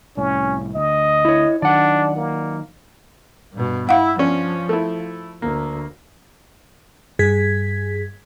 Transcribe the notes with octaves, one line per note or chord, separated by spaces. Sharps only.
C2 A2 C#4
D2 D#5
E4 C#5
D#3 F#3 D4 D5 F#5
A#3
G2 B2
E4 F5 F#5
F3 C#4 D4
A3 E4
D2 A#3
G2 G#4 G#6 B6